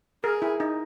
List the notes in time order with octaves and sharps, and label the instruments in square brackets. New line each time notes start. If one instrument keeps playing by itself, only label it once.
[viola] G#4 [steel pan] A#4
[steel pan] E4
D#4